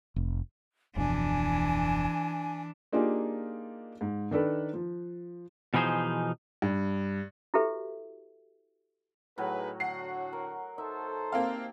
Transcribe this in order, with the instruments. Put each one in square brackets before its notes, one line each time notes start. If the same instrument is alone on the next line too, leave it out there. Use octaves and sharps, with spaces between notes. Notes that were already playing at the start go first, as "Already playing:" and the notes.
[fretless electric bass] F1
[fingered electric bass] D1 F2 B2 [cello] E3 D4 [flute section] G#5
[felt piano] A#3 D4 D#4 F4 G4 G#4
G#2
D#3 D4 A4 B4
F3
[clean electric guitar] B2 E3 F3 D#4 G#4 C5
[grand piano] G2
[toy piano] E4 F#4 G4 A4 B4 E5
[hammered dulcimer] A2 F#3 [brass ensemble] D#4 G#4 B4
[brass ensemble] D3 F#4 [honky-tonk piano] F#5 C7
[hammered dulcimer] A#4
[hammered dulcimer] D#4 E5 [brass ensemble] A4 C5
[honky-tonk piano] A#3 C4 F5 [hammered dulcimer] G4 G5 A5